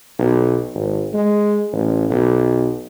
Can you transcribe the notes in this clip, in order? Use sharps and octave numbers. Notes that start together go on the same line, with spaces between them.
B1
G#1
G#3
A1
B1